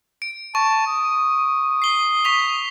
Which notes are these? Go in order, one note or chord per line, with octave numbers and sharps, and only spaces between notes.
D7
A5 C#6
D#6
C7 G7
C#6 B6 F7